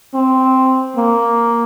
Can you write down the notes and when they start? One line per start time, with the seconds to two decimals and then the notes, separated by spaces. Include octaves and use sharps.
0.14 C4
0.96 A#3